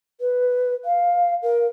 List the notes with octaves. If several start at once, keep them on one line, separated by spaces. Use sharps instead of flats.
B4
F5
A#4